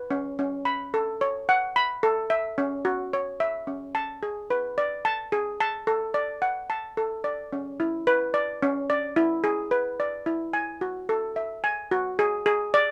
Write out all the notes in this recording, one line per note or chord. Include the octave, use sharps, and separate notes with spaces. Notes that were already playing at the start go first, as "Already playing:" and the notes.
Already playing: B4
C#4
C#4
B5
A4
C#5
F#5
B5
A4
E5
C#4
F#4
C#5
E5
C#4
A5
G#4
B4
D5
A5
G#4
A5
A4
D5
F#5
A5
A4
D5
C#4
E4
B4
D5
C#4
D5
E4
G#4
B4
D5
E4
G#5
F#4
A4
E5
G#5
F#4
G#4
G#4
D5